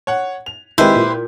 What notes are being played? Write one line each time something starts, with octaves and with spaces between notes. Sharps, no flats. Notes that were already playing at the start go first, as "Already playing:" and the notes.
C#5 F#5
F7
D#3 G#3 C4 E4 G4 B4 C5
A#2